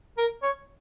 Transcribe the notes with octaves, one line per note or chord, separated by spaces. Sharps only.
A#4
C#5